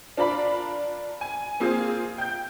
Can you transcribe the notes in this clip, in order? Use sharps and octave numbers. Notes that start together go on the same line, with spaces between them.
D4 F4 A#4 D5 B5
G#5
A#3 C4 F4 G#4
G5 G6